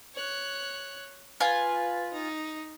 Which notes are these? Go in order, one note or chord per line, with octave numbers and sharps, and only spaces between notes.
C#5 F#6
F4 B4 G#5
D#4